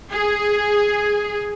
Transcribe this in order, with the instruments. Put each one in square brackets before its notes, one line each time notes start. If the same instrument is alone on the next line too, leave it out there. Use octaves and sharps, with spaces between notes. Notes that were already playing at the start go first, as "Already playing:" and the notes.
[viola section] G#4